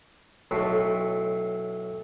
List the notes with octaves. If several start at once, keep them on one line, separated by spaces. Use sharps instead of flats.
B1 A2